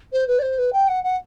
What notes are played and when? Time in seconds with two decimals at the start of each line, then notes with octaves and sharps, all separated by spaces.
0.12 C5
0.27 B4
0.38 D5
0.42 C5
0.58 B4
0.72 G5
0.88 F#5
1.03 F#5